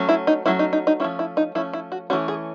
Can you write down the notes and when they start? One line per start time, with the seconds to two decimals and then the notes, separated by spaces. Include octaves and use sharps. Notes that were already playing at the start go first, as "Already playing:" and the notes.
Already playing: F#3 A3 C#4
0.09 E4
0.27 D#4
0.46 F#3 A3 C#4 E4
0.59 D#4
0.73 D#4
0.87 D#4
1.00 F3 A3 C#4 E4
1.19 E4
1.37 D#4
1.55 F3 A3 C#4 E4
1.73 E4
1.92 F#4
2.10 E3 A3 C#4 F#4
2.28 G#4